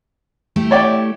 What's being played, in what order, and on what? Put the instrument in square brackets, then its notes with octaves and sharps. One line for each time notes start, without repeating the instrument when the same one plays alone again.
[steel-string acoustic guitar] A3 E4 G4
[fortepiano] C#5 D5 G5